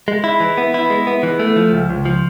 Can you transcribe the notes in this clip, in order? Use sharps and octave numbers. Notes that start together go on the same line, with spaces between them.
G#3
E4
E3
B3
E4
G#3
B3
E3
A3
F3
C#2
C#2
F3